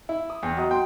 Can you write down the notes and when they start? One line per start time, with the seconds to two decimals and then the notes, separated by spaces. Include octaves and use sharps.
0.09 E4
0.30 D#6
0.43 E2 G5
0.57 F#3 D#5 F#5
0.71 G5 C6